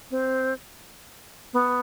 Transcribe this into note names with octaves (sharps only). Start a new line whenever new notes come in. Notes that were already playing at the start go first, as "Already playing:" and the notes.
C4
B3